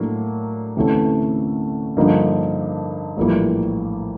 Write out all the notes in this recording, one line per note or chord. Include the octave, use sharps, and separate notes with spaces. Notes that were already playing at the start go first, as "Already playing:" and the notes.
Already playing: A2 F#3 A#3 D4
D2 C3 E3 A3 C#4
G2 D3 F3 A#3 D#4
A#1 A2 E3 G3 A#3